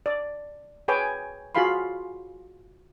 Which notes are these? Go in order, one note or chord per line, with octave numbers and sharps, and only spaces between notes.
D5
G#4 B4 C#5 G5 G#5 D6
F4 F#4 G#4 F5 B5 C6